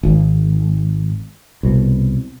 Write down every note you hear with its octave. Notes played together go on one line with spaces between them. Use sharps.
G#1
C2 B2